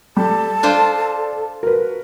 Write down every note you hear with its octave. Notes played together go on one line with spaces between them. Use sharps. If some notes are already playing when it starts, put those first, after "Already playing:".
G3 A4 A5
D4 F4 C5 D5
F#4 A#4 B4